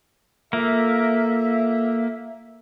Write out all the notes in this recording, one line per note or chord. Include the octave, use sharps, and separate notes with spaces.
A#3 F4 A4 E5